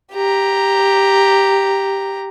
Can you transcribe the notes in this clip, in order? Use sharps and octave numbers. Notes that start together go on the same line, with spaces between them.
G4 A#5